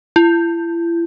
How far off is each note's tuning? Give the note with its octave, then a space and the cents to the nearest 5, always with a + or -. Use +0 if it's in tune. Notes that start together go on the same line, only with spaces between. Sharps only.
E4 +40